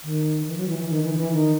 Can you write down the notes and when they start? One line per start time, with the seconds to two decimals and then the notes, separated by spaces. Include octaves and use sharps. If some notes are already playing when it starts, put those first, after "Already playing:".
0.04 D#3
0.47 E3
0.57 F#3
0.68 E3
0.78 E3
0.90 D#3
1.03 E3
1.13 D#3
1.18 E3
1.32 D#3